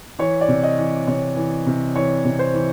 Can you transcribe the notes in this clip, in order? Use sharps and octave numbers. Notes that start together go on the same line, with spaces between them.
E3 C#5
D5
C3
D#5
E3
C3 C#5
E3
C3
E3 C#5
C3
C5
E3